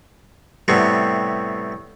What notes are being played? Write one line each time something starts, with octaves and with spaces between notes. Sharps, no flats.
A2 C3 G3 B3